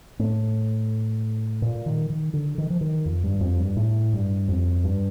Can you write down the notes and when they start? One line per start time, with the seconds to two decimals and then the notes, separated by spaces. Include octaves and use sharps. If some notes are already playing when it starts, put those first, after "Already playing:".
0.19 A2
1.62 A#2
1.86 D#3
2.10 D#3
2.34 D3
2.58 D#3
2.70 F3
2.81 D#3
3.06 F2
3.24 G2
3.41 F2
3.60 G2
3.76 A2
4.13 G2
4.48 F2
4.84 G2